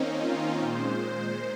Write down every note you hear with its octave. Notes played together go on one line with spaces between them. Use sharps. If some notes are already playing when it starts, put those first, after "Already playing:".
Already playing: D#3 A#3 C4 C#4 D#4
F4
A#2 G#3 C5
C5